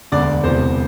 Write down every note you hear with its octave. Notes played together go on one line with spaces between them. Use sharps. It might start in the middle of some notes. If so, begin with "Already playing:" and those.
E1 D2 D3 D5
E1 E2 C3 C5